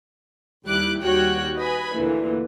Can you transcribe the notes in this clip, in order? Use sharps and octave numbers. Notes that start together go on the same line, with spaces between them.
D#2 G3 E4 D6 F#6
D#2 G3 F#4 C#5 G5 F#6
B4 D#5 G#5 B5
D2 A#2 D3 E3